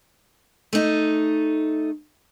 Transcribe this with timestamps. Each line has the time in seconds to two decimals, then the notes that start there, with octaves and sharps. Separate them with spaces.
0.73 A3 D#4